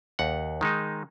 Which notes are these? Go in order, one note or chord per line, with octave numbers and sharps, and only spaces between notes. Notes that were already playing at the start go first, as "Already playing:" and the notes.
D#2 F#5
D#3 G#3 D#4